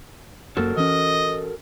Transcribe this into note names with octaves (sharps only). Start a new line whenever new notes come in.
F#1 F#2 A#3 F#4 A4 A#4
E3 C#4 D#5